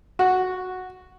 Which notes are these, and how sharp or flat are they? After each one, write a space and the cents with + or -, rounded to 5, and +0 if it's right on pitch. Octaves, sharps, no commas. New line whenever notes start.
F#4 -5